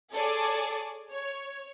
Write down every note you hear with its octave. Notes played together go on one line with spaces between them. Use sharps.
G#4 A4 C#5 D5
C#5